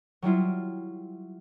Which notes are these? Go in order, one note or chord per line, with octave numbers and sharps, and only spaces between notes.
F#3 G3 E4 F4